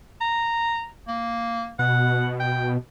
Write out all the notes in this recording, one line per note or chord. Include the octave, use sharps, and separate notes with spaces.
A#5
A#3
B2 F#5
G5